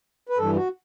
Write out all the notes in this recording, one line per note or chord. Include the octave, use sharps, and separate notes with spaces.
B4
G2 E3 A4
F#4